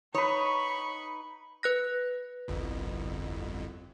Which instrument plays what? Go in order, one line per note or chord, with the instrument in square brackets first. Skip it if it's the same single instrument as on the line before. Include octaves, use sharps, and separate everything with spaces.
[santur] D#4 B4 [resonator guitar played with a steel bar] C#5 [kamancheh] B5 C#6
[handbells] B4 F#6 A#6
[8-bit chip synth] G1 C2 F2